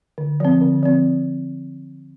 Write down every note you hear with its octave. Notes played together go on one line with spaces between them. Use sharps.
D3
F3 C4
D3
F3 C4